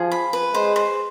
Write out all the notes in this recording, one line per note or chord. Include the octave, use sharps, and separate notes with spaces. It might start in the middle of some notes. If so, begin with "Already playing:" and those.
Already playing: F3 G#4
B5
B4
G#3 C5
C5